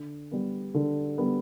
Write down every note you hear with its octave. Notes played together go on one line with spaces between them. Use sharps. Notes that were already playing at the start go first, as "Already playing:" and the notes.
Already playing: D3
G3 B3
D3
G3 B3